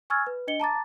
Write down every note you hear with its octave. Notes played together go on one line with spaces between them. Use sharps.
G#5 C#6 E6 F6 G#6 A6
B4
D4 D#5 C#7 G7
A5 A#5 D6 A6